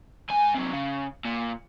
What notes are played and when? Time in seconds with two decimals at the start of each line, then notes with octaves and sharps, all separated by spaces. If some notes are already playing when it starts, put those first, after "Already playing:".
0.30 G#2 G#5
0.55 C3 F#3
0.72 C#3
1.25 A#2